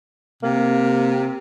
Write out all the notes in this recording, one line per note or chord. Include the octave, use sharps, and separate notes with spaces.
C3 A#3